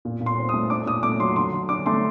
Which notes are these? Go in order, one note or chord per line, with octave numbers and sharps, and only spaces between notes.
A#2
A#2
C6
C4
D#6
A3
D4 D6
A#2 D#6
A3 D6
F#3 C6
D3 C6
D3
D4 D6
A3 C6